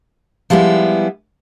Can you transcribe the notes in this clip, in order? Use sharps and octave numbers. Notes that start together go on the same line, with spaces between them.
F3 G3 G#3 B3 E4